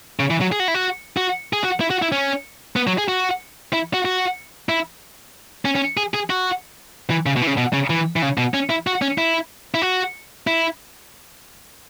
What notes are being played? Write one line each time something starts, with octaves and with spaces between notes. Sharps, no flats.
C#3
E3
F#3
G#4
F#4
E4
F#4
F#4
G#4
F#4
E4
F#4
E4
C#4
B3
F#3
G#4
F#4
E4
F#4
F#4
E4
C#4
C#4
G#4
G#4
F#4
E3
C#3
B2
E3
C#3
B2
C#3
E3
E3
C#3
B2
C#4
E4
F#4
C#4
E4
E4
F#4
E4